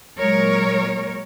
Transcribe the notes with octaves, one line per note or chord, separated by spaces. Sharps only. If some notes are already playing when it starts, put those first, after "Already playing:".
A#2 F#3 G#3 A#4 C#5